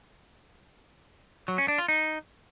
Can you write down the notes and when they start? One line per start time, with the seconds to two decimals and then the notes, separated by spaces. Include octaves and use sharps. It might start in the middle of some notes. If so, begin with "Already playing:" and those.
1.48 F#3
1.58 C#4
1.68 D4
1.78 F4
1.88 D#4